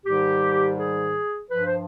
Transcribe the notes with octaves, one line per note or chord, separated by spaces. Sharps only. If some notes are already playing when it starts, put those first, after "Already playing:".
G#2 D#3 G3 G4
G#4
G2 F3 B4
C5